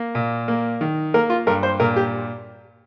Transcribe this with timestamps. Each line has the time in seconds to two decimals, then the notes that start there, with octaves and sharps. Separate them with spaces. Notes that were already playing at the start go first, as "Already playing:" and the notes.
Already playing: A#3
0.15 A#2
0.48 A#3
0.81 D#3
1.14 A#3 A#4
1.30 F4
1.47 G2 A#4
1.63 C5
1.80 A#2 A#4
1.96 G4